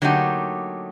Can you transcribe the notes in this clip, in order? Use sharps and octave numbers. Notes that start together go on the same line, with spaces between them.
D3 F#3 A3 A#3 D#4 G4